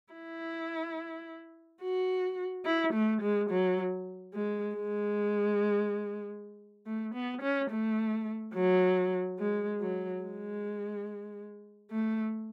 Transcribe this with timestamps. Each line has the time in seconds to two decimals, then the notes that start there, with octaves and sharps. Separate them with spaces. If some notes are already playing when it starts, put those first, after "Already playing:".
0.13 E4
1.82 F#4
2.65 E4
2.93 A3
3.22 G#3
3.50 F#3
4.34 G#3
4.76 G#3
6.86 A3
7.14 B3
7.42 C#4
7.70 A3
8.54 F#3
9.39 G#3
9.80 F#3
10.23 G#3
11.91 A3